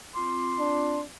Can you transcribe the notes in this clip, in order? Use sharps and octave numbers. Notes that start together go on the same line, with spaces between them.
C4 F4 C6 D6
D4